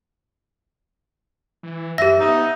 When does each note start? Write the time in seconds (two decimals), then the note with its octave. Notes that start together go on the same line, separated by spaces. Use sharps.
1.63 E3
1.98 F#2 G4 E5 A#6
2.21 B3 D#4